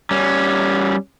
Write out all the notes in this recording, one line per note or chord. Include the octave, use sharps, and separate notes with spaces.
G3 C#4